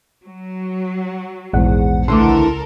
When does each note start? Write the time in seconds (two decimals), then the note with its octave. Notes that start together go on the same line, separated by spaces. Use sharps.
0.24 F#3
1.53 A#1 E2 G#2 F#5
2.08 C#2 D3 E3 A3 A4 A#4 C6 D6